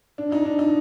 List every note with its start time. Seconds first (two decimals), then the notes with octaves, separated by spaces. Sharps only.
0.18 D4
0.32 D#4
0.45 D4
0.59 D#4